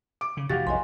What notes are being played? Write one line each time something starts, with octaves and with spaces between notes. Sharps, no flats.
D6
C#3
F1 A#2 E3 F#4 G4 F5 A6
B1 D#5 G#5 C6